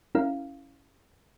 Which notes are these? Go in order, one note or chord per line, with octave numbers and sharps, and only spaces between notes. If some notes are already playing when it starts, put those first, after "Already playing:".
C#4 E4 A#4 F5